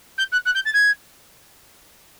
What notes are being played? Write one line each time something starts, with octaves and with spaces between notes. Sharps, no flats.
G6
F#6
F#6
G6
A6
G#6